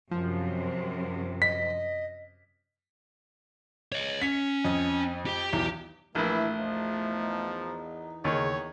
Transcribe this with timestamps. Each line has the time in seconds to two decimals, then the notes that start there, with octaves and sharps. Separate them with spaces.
0.11 F#2 C3 F3
1.42 D#5 B6
3.92 C#5 D#5
4.22 C#4 B6
4.65 F2 D#5
5.26 G4 G5
5.53 B1 E2
6.15 A#1 E3 A3 E4
6.59 E2 F3 D#4
8.25 D#2 C#3 C#5